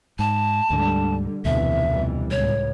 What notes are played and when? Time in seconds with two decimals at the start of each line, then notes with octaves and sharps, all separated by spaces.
0.19 G#2 A5
0.70 D2 G#2 D3 G3
1.45 F1 D2 B2 D3 E3 E5
1.88 F2 E3 G3
2.31 C#2 A2 C#5